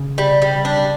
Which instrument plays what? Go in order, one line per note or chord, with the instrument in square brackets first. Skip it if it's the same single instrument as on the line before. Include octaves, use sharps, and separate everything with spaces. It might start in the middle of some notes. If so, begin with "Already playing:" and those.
Already playing: [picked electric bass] C#3
[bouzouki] G3
G3
D4